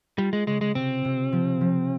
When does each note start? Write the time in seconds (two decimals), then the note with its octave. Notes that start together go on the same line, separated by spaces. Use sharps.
0.18 G3 F4
0.33 G#3
0.47 C#3 G#3
0.61 G#3
0.75 C3 C4
1.05 C3
1.32 F3
1.61 F3